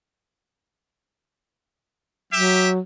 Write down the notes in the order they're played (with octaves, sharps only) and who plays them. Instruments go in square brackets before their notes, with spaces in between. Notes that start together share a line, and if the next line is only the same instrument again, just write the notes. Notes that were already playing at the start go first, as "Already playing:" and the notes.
[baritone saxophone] F#3 [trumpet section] G4 E5